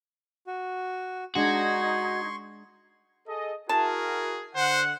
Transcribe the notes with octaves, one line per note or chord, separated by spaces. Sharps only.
F#4
G#3 D4 D#4 F#4 C6 C#6 G#6 C#7
G#4 A4 D#5
E4 F#4 G#4 A#4 A5
D3 C5 F#5